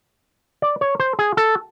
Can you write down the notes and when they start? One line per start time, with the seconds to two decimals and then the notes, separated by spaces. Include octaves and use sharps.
0.62 D5
0.81 C#5
1.00 C5
1.19 G#4
1.37 A4